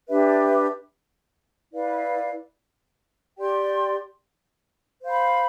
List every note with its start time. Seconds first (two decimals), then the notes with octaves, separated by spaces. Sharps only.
0.08 D4 G4 B4 E5
1.73 E4 B4 D5 F5
3.37 G4 D5 G5 C6
5.02 C5 F5 B5